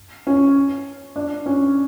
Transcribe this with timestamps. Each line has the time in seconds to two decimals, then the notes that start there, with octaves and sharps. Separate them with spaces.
0.27 C#4
1.16 D4
1.46 C#4